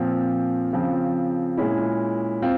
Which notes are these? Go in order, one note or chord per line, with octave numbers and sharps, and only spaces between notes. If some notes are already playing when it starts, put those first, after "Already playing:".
Already playing: A#2 F3 C4 F4
C#3 F3 C4 F4
A#2 G#3 C#4 E4
C4 F4